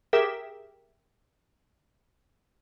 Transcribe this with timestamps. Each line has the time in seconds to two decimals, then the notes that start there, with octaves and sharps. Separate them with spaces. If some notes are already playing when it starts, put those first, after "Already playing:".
0.13 G4 G#4 A#4 E5 G5